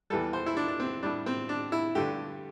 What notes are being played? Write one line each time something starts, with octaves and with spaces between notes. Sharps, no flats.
E2 E3 G3 A4
C5
E4
D4
D4
C4
A2 G3 D4
C4
D4
E4
G2 D3 A3 G4